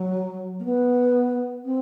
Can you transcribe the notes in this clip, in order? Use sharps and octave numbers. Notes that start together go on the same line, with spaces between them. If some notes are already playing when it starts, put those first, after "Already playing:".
Already playing: F#3
A#3
B3
C4